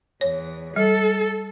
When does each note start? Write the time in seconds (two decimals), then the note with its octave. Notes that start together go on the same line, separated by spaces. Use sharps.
0.21 E2 C#5
0.76 G3 A4